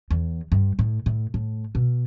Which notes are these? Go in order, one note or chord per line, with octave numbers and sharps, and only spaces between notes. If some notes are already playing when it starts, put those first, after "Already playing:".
E2
G2
A2
A2
A2
B2